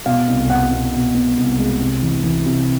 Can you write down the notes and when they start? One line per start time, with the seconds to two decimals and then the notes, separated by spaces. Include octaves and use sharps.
0.06 B2 F5
0.28 C2
0.50 B3 F#5
0.71 B2
0.93 B2
1.14 B3
1.37 C2
1.58 G#3
1.81 C3
2.02 E3
2.24 E3
2.46 C3